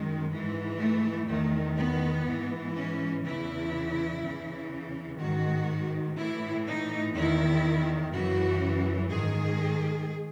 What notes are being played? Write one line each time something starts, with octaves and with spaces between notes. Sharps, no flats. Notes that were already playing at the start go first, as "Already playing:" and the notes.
Already playing: F#2 D#3 G#3
G#2 E3
A3
E2 D#3 A3
B3
G#2 E3
C#4
E2 C#3 E3 E4
E2 C#3 E3
G#2 D#3 F#4
A2 E3 E4
D#4
E2 D#3 E4
F#2 C#3 E3 F#4
G#2 D#3 G#4